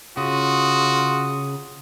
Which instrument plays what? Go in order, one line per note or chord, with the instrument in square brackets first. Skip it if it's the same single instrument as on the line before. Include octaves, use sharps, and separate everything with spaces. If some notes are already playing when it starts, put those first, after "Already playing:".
[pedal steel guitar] C#3 [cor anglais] F4 [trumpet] F#4 [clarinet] D#6